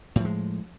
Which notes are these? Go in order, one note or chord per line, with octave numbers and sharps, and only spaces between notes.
A2 F3 G#3